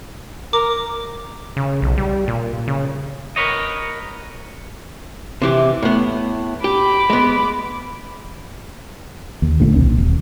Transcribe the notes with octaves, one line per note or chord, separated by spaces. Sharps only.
A#4 D6
C#3
B1
G3
A#2
C#3
A#4 B4 C#5 D#5
C3 E3 G4
A2 B3
G4 B5 D6
G#3 B3
D#2
D#1 D2 A#2 D3
B1 C4
D#1